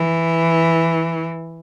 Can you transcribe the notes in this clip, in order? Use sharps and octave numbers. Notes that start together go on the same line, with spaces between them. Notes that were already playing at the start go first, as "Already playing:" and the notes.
Already playing: E3